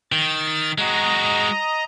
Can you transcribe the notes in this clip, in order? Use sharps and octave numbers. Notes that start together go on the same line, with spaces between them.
D#3 A6
G#3 F#4 D#5 A#5